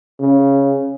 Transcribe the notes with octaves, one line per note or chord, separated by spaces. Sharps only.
C#3